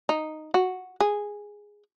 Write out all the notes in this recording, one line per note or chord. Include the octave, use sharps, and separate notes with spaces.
D#4
F#4
G#4